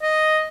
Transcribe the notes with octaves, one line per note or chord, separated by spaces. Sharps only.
D#5